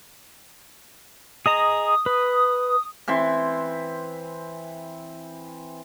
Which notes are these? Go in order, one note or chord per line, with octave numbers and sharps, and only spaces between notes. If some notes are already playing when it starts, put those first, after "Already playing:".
G#4 D#5 A#5 D#6
B4
E3 C4 E5 C6